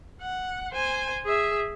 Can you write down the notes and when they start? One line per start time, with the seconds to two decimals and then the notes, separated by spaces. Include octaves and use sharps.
0.21 F#5
0.72 C5 G#5
1.25 G#4 E5